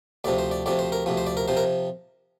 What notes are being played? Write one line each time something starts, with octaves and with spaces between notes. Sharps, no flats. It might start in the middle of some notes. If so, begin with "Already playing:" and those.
D2 C3 F3 D5
C5
D5
D2 C3 F3 D5
C5
A#4
D2 C3 F3
C5
D5
A#4
C3 F3 C5
A#4